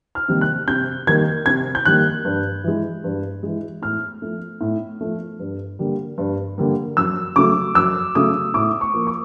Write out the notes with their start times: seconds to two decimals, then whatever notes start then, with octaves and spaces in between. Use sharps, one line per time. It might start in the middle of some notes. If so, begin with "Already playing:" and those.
0.15 F6
0.28 C3 D#3 G3 A#3
0.41 F#6
0.68 C3 G6
1.07 D#3 G3 A#3 G#6
1.46 C3 G#6
1.75 G6
1.85 D#3 G3 A#3 F#6
2.25 G2
2.64 E3 G#3
3.04 G2
3.43 E3 G#3
3.82 A2 F6
4.22 F3 A3
4.61 A2
5.01 F3 A3
5.40 G2
5.79 D3 G3 A#3
6.18 G2
6.58 D3 G3 A#3
6.97 F#2 E6
7.36 C#3 F#3 A3 D6
7.75 F#2 E6
8.15 C#3 F#3 A3 D#6
8.54 A2 D6
8.81 C#6
8.94 F3 A#3
9.07 D6